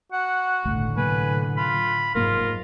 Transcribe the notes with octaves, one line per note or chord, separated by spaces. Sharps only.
F#4 F#5
G1 C#2 A2 D3 A3
C3 F#3 A#3 B4 G#5
F4 B5
F1 G#2 F#3 A#3 F4 A#4